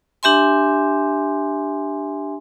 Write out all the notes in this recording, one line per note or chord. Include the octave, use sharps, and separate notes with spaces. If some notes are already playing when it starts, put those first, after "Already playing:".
D4 G4 E5 G#5 C6